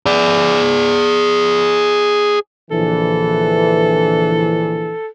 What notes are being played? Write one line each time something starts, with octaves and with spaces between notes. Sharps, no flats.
G#4 D5
A#1 D3 E3 A4